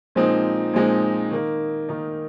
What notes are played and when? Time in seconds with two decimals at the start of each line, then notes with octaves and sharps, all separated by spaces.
0.15 A#2 F3 G#3 C4 D#4
0.73 A#2 F3 G#3 C4 D#4
1.31 D#3 A#3 D#4
1.89 D#3 A#3 D#4